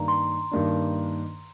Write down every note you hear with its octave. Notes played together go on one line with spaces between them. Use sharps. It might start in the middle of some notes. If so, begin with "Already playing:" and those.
Already playing: G2 D#3 A#3 D4 A#5
C6
G2 D#3 A#3 D4